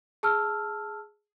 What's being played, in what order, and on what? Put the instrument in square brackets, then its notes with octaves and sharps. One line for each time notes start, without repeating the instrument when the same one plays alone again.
[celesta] G#4 A5 E6 F6